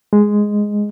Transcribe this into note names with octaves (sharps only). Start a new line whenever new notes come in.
G#3